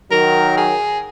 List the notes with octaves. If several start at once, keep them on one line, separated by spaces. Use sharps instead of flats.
D#3 F#3 A#4
G#4